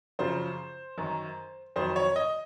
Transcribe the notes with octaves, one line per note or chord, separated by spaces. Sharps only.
F#2 C#3 F3 C5
F#2 D#3 F#3
F2 D#3 F#3 C5
C#5
D#5